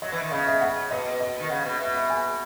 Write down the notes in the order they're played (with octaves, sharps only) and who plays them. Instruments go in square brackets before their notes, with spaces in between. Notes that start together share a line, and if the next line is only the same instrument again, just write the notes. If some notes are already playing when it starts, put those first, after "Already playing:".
[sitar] F#3 [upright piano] D#5
[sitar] E3
D#3
[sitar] C#3 [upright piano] D#5
[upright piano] E5
F#5
[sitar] B2 [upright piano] D#5
[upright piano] D#5
[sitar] D#3
[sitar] C#3 [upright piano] F#5
[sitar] B2 [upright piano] F#5
[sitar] B2 [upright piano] E5
[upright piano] E5
G#5